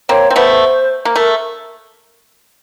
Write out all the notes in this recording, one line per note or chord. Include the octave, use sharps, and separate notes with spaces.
A#3 C4 C#5
C4
A3 B3 C5
A#3
A3 A#4